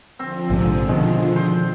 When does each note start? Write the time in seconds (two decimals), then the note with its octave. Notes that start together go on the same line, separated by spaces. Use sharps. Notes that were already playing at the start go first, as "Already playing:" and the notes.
0.19 D3 F3 C4
0.50 A#1 G#2 C3 G#5
0.89 B2 D#3 G#3
1.36 C5